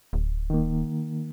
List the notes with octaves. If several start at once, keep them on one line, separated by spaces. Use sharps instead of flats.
D1
D#3 A#3